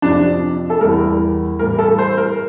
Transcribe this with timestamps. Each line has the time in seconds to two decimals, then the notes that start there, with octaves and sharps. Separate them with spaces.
0.02 F2 C3 F3 D4
0.70 A4
0.81 E2 E3 G3 A#3 A#4
1.59 A2 E3 G3 A#3 A#4
1.79 A4
1.98 C5
2.17 A#4